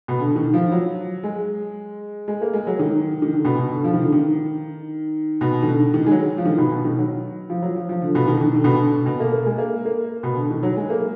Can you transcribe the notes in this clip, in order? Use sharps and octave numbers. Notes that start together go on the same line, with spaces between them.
B2
D3
D#3
F3
F#3
G#3
G#3
A#3
G#3
F#3
D#3
D#3
D3
B2
B2
D3
F3
D#3
D3
D#3
B2
D#3
D3
D#3
G#3
F#3
F3
D#3
B2
B2
D#3
F#3
F3
F#3
F3
F3
D3
B2
D#3
D#3
D3
B2
D3
B2
A#3
A#3
G#3
A#3
A#3
B2
D3
D#3
F#3
G#3
A#3